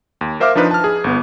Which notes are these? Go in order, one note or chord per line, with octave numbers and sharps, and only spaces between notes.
D#2
A#4 C5 E5 F5 D6 F6
F3 D4 D#4 B4
A5 F6
G#4
G1 B3